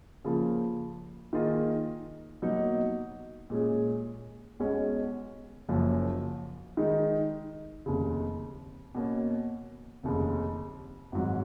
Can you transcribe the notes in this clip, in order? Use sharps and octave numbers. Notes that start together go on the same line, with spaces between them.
C#3 F3 A#3 F4
D#3 A#3 F4 G#4 D#5
B2 F#3 A#3 D#4
A#2 G#3 C#4 G#4
B1 B2 G#3 C#4
F#1 F#2 F3 A#3 C#4
D#3 G#3 D#4
F1 D#2 C#3
B2 A#3 C#4
F1 D#2 C#3
G#1 G#2 F#3